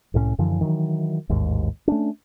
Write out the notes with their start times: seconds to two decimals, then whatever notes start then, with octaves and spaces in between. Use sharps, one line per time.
0.14 C2 A2 F#3 C#4
0.39 F#2 D3 E3 F3
0.61 D#3 E3 F#3
1.29 A1 D#2 G#2
1.88 A3 C#4 D4